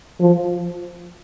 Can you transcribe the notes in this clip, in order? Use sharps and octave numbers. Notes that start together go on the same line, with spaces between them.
F3